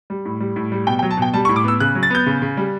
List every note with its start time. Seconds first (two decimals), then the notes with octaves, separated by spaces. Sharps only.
0.10 G3
0.25 A2
0.40 G3
0.56 A2
0.72 G3
0.87 B2 G5
0.99 G5
1.03 F#3
1.11 A5
1.17 B2 G5
1.34 G3 A5
1.45 C#6
1.49 A2
1.56 D6
1.64 B3 E6
1.80 C#3 F#6
1.95 F#3
2.03 A6
2.10 B3 G6
2.26 C#3
2.42 C#3
2.57 G3